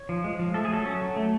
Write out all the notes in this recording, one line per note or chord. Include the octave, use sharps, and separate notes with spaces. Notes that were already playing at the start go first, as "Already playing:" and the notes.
Already playing: C#5
F3
G#3
F3
A3 A4
G#4
F#3 A4
C#4
F#3
A3